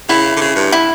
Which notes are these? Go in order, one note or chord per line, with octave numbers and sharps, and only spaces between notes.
C#3 E4
D3
C#3
G2
E4